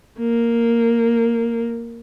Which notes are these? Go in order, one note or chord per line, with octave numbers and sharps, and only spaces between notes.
A#3